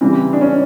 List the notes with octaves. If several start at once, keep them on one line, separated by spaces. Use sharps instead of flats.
C#3 E3 G3 C4
D4
C#4